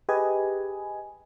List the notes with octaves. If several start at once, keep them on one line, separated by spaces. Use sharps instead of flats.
G4 G#4 B4 D#5 G#5